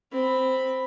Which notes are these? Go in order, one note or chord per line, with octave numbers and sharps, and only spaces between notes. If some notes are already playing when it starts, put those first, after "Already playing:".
C4 B5